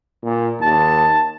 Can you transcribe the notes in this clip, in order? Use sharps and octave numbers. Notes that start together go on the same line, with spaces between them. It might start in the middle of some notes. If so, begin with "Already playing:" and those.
A#2
D#2 A5